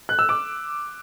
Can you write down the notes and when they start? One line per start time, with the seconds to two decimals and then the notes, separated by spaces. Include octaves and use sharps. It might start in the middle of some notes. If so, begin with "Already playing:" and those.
0.09 F#6
0.19 E6
0.29 D6